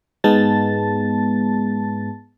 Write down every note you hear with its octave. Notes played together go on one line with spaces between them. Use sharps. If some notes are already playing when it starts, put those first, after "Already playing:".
G#2 G#3 B3 A5 A6